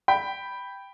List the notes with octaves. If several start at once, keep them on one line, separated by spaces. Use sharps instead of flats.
G5 B5